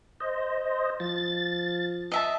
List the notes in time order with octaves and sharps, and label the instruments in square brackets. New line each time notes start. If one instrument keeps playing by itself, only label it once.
[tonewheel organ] C5 D#5
[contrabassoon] F3 [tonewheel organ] A6
[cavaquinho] D#5 E5 A5